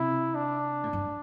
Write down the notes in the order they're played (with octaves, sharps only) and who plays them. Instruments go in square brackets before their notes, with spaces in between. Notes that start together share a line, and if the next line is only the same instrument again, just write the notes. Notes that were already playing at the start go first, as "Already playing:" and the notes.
Already playing: [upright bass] C3 [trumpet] E4
[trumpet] D4
[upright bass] A2
G2